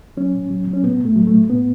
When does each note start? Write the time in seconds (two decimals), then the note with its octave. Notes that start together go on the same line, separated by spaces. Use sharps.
0.17 F#3 C#4
0.34 A2
0.51 F#3
0.67 F#3
0.74 C#4
0.83 A2 B3
1.00 A2
1.05 A3
1.16 F#3
1.27 A3
1.33 A2
1.49 A2 B3